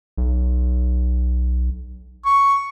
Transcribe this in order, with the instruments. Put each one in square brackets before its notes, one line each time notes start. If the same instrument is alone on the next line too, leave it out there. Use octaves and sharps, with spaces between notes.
[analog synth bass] B1
[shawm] C#6